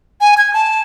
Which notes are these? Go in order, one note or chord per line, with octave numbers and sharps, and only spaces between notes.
G#5
G#6
A5